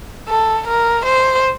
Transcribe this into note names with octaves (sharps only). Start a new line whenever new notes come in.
A4
A#4
C5